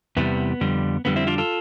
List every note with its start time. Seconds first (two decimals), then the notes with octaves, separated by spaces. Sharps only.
0.17 E2 C3 E3 G3 B3
0.61 F2 D3 G3
1.05 F2 D3 G3 B3
1.16 C4 E4
1.27 D4 F4
1.38 F4 A4